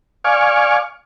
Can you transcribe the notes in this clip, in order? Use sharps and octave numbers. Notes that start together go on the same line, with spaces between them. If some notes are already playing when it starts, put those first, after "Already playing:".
D5 F5 G#5 C#6